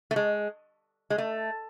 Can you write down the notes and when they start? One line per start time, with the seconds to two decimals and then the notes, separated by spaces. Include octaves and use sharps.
0.11 A3
0.16 G#3
1.10 G#3
1.18 A3